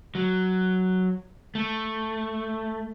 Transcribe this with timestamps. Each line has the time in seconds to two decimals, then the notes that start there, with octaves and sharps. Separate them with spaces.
0.15 F#3
1.55 A3